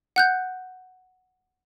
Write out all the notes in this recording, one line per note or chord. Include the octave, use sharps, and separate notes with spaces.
F#5 F#6 G6